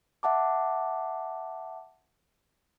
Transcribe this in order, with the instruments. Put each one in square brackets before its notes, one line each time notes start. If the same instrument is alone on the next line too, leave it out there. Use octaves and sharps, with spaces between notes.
[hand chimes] E5 F#5 A5 D6